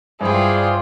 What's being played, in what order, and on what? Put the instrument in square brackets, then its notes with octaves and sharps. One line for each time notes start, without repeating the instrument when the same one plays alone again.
[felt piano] G2 G5 [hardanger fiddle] E4 F4 [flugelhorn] G#4 [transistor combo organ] C5 D5 F5